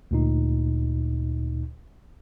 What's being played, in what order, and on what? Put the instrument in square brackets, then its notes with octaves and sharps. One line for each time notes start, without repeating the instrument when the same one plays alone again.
[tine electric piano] D2 A#2 D#4